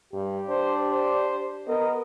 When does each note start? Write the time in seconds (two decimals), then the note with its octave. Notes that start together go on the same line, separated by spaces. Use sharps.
0.13 G2 G4
0.49 D4 C5
0.90 C5
1.68 B3 A#4 D#5